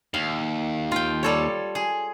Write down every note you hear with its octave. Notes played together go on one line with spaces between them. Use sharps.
D#2 F5
F4 G5
G3 A4 C#5
G#4